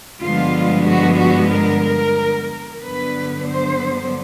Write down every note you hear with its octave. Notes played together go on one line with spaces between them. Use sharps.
G2 D3 F3 G#3 B3 F4
F#4
F#4
A#4
G2 D3 F#3 B3 B4
C5